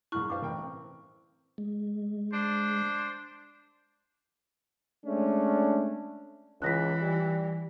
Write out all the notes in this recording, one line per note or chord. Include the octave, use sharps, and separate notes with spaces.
A#1 G#2 E4 C#6 F6 F#6
G2 B4 C5 F5 D6
A1 A#4 G5
C4
G#3
D4 C5
G#3 A3 C#4 D4
C#2 E3 F#6 A#6 B6
G3